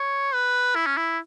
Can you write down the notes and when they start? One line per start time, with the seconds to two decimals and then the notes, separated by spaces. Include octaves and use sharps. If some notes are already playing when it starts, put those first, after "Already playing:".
Already playing: C#5
0.34 B4
0.75 E4
0.86 C#4
0.97 E4